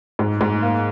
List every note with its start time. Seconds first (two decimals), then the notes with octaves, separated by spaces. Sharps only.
0.19 G#2
0.41 G#2
0.62 A#3